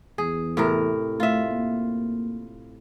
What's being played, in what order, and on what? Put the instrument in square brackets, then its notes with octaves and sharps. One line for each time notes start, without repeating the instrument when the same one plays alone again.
[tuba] E2 [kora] G#4
[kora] A2 C3 A#4
[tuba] A3 [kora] F4 E5
[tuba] A#3